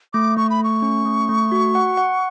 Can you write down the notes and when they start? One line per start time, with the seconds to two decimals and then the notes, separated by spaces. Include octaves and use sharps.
0.13 A3 D6
0.37 A3 C#6
0.50 B5
0.59 A3 C#6
0.82 C#4
1.05 A3
1.29 A3
1.52 F#4
1.75 F#5
1.97 F#5